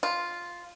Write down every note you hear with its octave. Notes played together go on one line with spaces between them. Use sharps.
F4